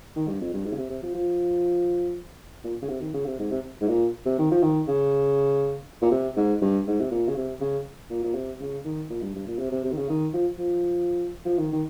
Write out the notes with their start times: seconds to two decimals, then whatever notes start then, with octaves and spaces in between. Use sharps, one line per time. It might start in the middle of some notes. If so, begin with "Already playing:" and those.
0.16 D#3
0.28 G2
0.41 F2
0.54 G2
0.66 G#2
0.73 C#3
0.78 C3
0.90 C3
1.03 F3
1.15 F3
2.64 A#2
2.82 C#3
2.89 C3
3.01 D#3
3.14 C#3
3.26 C3
3.39 G#2
3.51 C3
3.81 G#2
3.88 A#2
4.26 C3
4.39 D#3
4.51 F3
4.63 D#3
4.88 C#3
6.02 A#2
6.11 C3
6.36 G#2
6.62 G2
6.87 G#2
7.01 C3
7.11 A#2
7.28 C#3
7.36 C3
7.60 C#3
8.10 A#2
8.24 A#2
8.35 C3
8.61 C#3
8.85 D#3
9.10 A#2
9.22 G2
9.35 G2
9.47 A#2
9.59 C3
9.71 C3
9.84 C3
9.92 D#3
9.97 C#3
10.10 D#3
10.34 F3
10.59 F3
11.45 F3
11.59 D#3
11.73 D#3